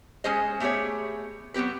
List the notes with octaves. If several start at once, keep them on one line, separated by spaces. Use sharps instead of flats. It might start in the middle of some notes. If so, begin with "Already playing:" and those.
G#3 C#4 G#4 C5 D#5
A3 B3 G4 G#4 C#5
F#3 B3 C4 G4 B4